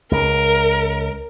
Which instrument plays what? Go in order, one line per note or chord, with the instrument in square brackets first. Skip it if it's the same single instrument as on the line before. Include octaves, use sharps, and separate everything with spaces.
[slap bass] C#2 [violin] A#4